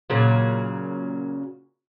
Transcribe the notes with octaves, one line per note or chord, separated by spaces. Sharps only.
A#2 C#3 F#3